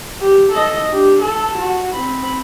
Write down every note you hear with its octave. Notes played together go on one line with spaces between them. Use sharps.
G4
A4 D#5
D4 G4
A4 A5
F#4
C4 B5